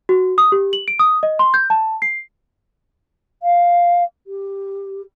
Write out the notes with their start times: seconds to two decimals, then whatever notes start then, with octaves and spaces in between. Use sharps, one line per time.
0.09 F#4
0.38 D#6
0.52 G4
0.73 F#7
0.88 D7
0.99 D#6
1.23 D#5
1.39 C6
1.54 G6
1.70 A5
2.02 C7
3.43 F5
4.27 G4